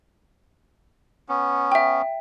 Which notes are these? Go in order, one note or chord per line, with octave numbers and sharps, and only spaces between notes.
B3 C#4
E5 G5